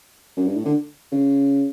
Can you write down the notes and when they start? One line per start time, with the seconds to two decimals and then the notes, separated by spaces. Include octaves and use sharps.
0.37 F#2
0.46 G2
0.55 A2
0.65 D3
1.11 C#3